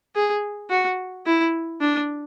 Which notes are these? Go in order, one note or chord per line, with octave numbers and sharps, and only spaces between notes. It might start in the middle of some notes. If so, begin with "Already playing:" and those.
G#4
F#4
E4
D4